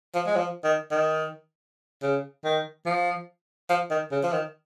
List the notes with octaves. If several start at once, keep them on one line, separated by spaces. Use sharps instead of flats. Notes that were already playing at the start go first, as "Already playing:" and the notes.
F3
G#3
F3
D#3
D#3
C#3
D#3
F3
F3
D#3
C#3
F3
D#3